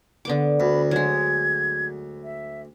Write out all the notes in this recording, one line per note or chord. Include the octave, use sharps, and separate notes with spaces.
D3 B3 D6
D2 B5
F#3 G#3 G#6
E5